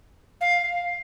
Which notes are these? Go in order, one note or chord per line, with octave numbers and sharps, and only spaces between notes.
F5